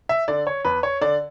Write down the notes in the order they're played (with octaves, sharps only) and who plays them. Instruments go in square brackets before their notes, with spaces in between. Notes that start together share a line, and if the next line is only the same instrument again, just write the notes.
[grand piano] E5
D3 D5
C#5
E2 B4
C#5
D3 D5